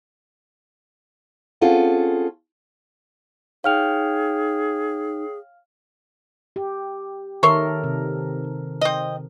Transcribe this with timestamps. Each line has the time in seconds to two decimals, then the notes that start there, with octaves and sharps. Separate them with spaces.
1.61 C4 C#4 F4 G#4 A4 F#5
3.64 D#4 G#4 C#5 F5 G5 F6 F7
6.56 G4
7.43 D#3 A4 A#4 C#5 E5 C6
7.84 C3
8.81 C4 D#5